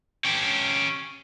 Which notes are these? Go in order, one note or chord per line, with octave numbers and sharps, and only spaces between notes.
C#4 G4